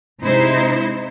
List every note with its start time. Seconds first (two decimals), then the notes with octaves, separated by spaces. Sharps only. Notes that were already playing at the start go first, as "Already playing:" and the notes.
0.23 C3 G#3 D#4 E4 C5